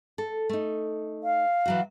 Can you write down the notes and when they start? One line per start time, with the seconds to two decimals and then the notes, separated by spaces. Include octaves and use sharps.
0.18 A4
0.49 A3 D#4
1.24 F5
1.66 E3 F#3 F#4